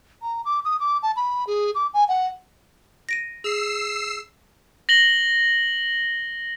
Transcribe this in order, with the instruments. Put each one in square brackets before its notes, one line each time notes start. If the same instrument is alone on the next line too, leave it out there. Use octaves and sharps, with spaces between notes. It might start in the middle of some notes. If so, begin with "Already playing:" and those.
[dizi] A#5
D6
D#6
D6
A5
B5
G#4
D6
G#5
F#5
[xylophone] A#6 D7 D#7
[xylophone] G#4 [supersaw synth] E6 C7
[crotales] A#6 F#7 G7